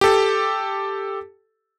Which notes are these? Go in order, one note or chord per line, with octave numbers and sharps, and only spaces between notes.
G4 A4